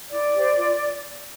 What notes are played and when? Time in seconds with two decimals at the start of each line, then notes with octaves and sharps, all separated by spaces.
0.12 E4 D5
0.34 G4 C5
0.57 F4